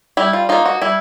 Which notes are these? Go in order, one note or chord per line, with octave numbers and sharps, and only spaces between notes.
G3 E4
F4
A#3 D#4 F4
F#4
G3 E4